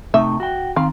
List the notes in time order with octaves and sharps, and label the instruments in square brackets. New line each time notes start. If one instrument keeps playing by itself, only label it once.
[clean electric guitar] C3 A3 D#4 [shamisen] E5
[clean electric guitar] F#4 G5
[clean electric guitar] D#3 C4 [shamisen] F5